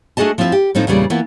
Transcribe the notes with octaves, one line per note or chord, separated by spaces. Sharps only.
A3 D4 F#4 G#4 D#5 A5
F3 C4 E4 F4 E5
G4
A2 F3 C4 D#4
E2 A#2 C#3 G3 D5
E3 A#3 B3 F4